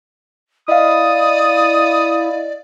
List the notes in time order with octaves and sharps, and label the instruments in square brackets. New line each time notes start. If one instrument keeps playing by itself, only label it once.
[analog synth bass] E4 [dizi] D5 [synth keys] D#5 F5 [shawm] D#6